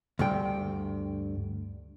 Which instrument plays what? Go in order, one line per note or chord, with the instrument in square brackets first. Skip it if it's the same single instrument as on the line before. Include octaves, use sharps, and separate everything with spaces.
[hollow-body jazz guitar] D2 G2 G5